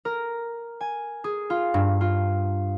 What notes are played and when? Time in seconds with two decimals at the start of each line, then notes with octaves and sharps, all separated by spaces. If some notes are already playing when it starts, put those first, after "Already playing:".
0.05 A#4
0.81 G#5
1.24 G#4
1.50 F4
1.74 G2
2.01 F4